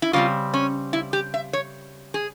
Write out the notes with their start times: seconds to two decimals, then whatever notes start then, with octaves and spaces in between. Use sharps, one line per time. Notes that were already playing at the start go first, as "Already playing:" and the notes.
0.02 E4
0.13 C#3 G3 C4 F4
0.54 C#4
0.93 E4
1.13 G4
1.34 E5
1.53 C#5
2.14 G#4